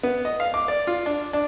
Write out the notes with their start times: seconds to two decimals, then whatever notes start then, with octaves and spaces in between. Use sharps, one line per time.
0.03 B3
0.25 D#5
0.40 F5
0.54 D6
0.68 D5
0.87 F4
1.06 D4
1.33 D4